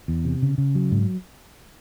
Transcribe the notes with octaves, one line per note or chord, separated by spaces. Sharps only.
E2
C3
C#3
C#3
F#3
G#2